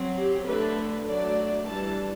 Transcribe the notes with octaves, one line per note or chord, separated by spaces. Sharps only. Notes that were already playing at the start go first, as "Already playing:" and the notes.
Already playing: F#3 C4
G4
D3 A3 D4 B4
F#3 A3 D4 D5
E3 G3 D4 A5